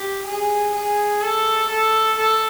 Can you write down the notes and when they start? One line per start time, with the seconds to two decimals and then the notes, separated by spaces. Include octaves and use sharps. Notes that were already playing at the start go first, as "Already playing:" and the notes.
Already playing: G4
0.26 G#4
0.74 G#4
1.22 A4
1.69 A4
2.17 A4